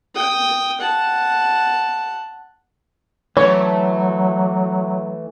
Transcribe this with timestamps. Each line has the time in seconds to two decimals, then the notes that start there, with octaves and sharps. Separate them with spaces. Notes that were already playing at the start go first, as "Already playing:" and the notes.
0.15 G5 D#6
0.80 F#5 A5
3.37 E3 F#3 A3 C#5